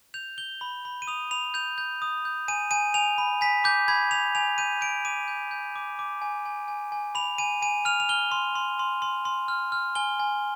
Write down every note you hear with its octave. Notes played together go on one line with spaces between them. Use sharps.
G6 F7
G6 G7
B5
B5
D#7
D#6 F7
B5 F7
G6 F7
G6
D#6
G6
G#5 D#7
G#5 D#7
G#5 F7
B5
G#5 B6
D6 G6
B5 G#6
B5 F7
G#5 F7
G6 D#7
G6 D7
D6 D#7
G6
G6
D6
D6
G#5
G#5
G#5
G#5
B5 F7
G#5 D#7
G#5 D#7
F6 F7
F7
F6 G7
C6
C6
C6
C6
C6
F6
F6
G#5 G7
G#5